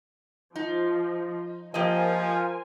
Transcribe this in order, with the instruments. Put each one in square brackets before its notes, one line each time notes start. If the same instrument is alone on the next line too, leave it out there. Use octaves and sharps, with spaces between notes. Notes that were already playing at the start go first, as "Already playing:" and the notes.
[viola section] F3 [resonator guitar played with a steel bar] D#4
[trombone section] F3 [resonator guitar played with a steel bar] A#3 G4 D#5 [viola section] A#4 C5 G#5